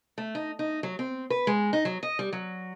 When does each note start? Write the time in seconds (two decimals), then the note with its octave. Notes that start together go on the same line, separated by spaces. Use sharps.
0.18 A3
0.35 D#4
0.59 D#4
0.83 F#3
0.99 C4
1.30 B4
1.47 G#3
1.73 D#4
1.85 F#3
2.03 D#5
2.19 G3
2.33 F#3